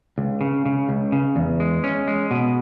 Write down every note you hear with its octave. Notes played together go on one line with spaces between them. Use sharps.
C#2
C#3
C#3
C#2
C#3
E2
G#3
C#4
G#3
B2